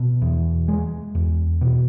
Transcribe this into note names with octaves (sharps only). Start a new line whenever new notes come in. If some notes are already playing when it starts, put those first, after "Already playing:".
Already playing: B2
E2
G#3
E2
B2